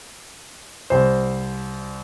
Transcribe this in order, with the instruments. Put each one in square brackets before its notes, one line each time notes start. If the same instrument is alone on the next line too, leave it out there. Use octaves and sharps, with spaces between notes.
[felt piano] C2 C5